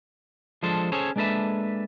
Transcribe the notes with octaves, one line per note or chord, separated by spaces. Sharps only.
F3 G#3 D4 A4 C5
C#4 G#4 A4 C5 C#5
G#3 A#3 D4 A4 B4 E5